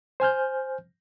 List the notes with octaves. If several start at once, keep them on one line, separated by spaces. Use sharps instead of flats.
C5 G#5 F6 G6